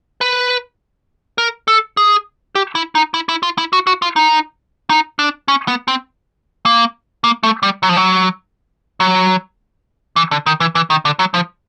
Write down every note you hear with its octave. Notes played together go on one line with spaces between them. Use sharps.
B4
A#4
A4
G#4
G4
E4
D#4
E4
E4
F4
E4
F#4
F#4
F4
D#4
D#4
D4
C#4
B3
C4
A#3
A#3
A3
G3
F#3
F3
F#3
F#3
E3
D3
D#3
E3
E3
D#3
D3
F#3
F3